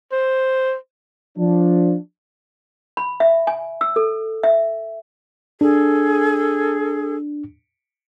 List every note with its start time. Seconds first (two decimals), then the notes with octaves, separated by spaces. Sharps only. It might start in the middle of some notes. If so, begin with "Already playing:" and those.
0.12 C5
1.36 F3 D4
2.97 B5
3.20 E5
3.47 G#5
3.81 E6
3.96 A4
4.43 E5
5.61 D4 G#4 A4